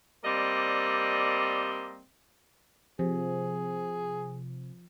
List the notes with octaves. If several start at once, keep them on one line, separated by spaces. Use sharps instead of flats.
G3 A#3 C4 D5 D#5
C3 F3 G#4